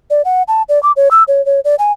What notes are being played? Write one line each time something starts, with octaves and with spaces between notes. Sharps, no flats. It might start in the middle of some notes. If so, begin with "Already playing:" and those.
D5
F#5
A5
D5
D6
C#5
E6
C#5
C#5
D5
G#5